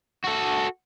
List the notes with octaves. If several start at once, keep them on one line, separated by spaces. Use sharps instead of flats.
F#4 A4